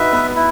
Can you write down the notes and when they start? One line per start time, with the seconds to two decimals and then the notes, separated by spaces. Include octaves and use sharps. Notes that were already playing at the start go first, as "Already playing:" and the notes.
Already playing: D#4 F#4 B4 E5
0.13 B3
0.36 E4